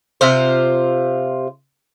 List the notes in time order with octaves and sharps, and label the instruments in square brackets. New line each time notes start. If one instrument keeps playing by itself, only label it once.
[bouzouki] C3 F4 C5